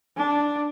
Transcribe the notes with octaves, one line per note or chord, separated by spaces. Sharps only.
D4